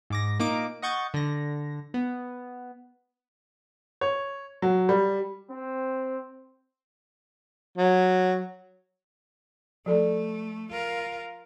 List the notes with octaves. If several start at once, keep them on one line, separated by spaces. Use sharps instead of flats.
G#2 D6 A#6
A#2 A#3 D#4 D6 D7
D#5 F#5 C#6 G6 A6
D3 A#6
B3
C#5
F#3
G3
C4
F#3
F3 A3 A4 D5
F4 A#4